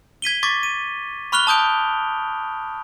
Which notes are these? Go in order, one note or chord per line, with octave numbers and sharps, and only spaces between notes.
G#6 B6 D#7 G7
C#6 D6 G#6 A6 B6
D#7
B5 C#6 F6 F#6 F7 G7
A5 D#6 G6 D7